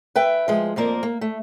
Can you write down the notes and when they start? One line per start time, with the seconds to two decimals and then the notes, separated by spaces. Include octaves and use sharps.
0.16 B4 E5 G5
0.48 F3 G#3
0.76 F2 F3 A#3 A#4 D5
1.03 A#3
1.21 A3